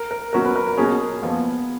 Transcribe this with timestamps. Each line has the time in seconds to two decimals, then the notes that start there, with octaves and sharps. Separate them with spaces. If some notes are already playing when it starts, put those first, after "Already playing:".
Already playing: A#4
0.11 A#4
0.33 B2 F#3 C#4 F#4 A#4
0.45 B4
0.56 A#4
0.67 A#4
0.78 B2 F#3 C#4 G#4
1.22 F2 F3 A#3 B3